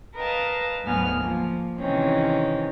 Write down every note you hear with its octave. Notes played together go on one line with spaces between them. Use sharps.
A#4 B4 D#5 F5 A5
D2 G#2 F#3 B3 G#5 F6
F3 A#3
C3 D#3 E3 G#3 C4 C#4